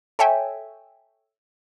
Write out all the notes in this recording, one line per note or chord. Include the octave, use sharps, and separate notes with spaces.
A4 C#5 E5 G5 G#5